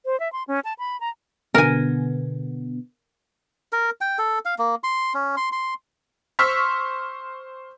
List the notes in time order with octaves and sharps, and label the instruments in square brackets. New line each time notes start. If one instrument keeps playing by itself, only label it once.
[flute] C5
E5
C6
C#4
A5
B5
A#5
[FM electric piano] B2 D3 B3 [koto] A#4 G#5
[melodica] A#4
G5
A4
F5
A#3
C6
C#4
C6
C6
[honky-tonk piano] C5 C6 C#6 E6 F6 B6